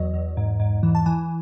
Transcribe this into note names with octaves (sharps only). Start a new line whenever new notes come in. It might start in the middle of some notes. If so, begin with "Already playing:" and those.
Already playing: E2 F#3 D#5
E2
G#2
G#2
E3
A5
E3 G#5